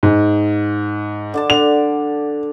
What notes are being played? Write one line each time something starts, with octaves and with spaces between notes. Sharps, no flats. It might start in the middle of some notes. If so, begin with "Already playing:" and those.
G#2
D3 D5 A5
D3 F7